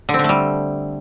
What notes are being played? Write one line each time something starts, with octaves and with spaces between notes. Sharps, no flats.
D3
C4
D3
A3
G3